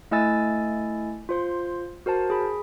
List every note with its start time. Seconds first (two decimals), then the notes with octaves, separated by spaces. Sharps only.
0.11 A3 E4 D#5 G#5 E6 A6
1.29 F4 C5 C6
2.06 F#4 A#4 C5 A5
2.30 G#4 B5